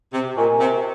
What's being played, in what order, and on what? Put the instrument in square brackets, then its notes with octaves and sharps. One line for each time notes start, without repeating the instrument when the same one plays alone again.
[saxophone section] C3
[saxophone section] A#2 [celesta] A#4 D#5 G#5 C#6
[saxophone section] C3